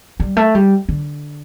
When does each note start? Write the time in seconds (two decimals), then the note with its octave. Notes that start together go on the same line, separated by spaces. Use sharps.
0.20 G3
0.37 A3
0.55 G3
0.89 D3